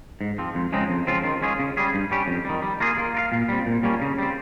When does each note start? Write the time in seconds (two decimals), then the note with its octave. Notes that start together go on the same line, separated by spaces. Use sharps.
0.21 G#2
0.38 F3 C4
0.55 F2
0.73 C#3 G#3 C4 D#4
0.90 F2
1.07 C#3 F3 C4 F4
1.24 D#3
1.42 G#3 C#4 F4 G#4
1.60 C#3
1.77 G3 C#4 G#4
1.94 G2
2.11 G3 C#4 G4
2.28 F2
2.45 D#3 G3
2.62 G3
2.80 A#3 F4 G#4
2.98 A#3
3.15 F4 A#4 F5
3.32 A#2
3.49 G3 C4
3.66 A#2
3.83 G3 A#3 C#4
4.02 C#3
4.19 G3 C4